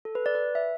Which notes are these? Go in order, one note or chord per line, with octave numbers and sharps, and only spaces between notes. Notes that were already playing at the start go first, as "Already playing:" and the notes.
A4
B4
D5
B4
E5